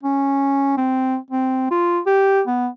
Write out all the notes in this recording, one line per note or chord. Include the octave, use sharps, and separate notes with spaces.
C#4
C4
C4
F4
G4
B3